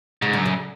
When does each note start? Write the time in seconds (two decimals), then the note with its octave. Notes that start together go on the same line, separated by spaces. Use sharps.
0.22 G#2 C#3
0.33 F#2 D3
0.46 C#3